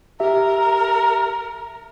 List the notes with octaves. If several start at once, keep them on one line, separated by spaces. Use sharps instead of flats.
G4 A#4 E5